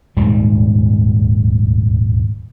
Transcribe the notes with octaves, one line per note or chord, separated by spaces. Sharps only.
D#1 D2 G#2 G3